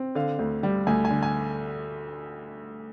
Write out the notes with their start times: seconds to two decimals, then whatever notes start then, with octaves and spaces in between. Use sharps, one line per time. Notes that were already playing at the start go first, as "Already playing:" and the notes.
Already playing: C4
0.15 D3 F5
0.39 D2
0.63 G3
0.87 D2 G#5
1.05 G#5
1.10 D3
1.23 G#5